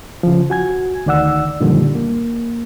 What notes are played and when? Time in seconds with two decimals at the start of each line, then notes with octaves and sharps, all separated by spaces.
0.23 C#3 F3
0.50 F#4 G#5 G#6
1.06 D2 D#3 D5 F#5 E6
1.60 F#2 A#2 D3 D#3 F3 G3
1.95 A#3